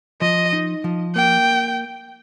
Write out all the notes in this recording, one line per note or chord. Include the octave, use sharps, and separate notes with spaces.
F3 D#5
D#4
F3
A#3 G5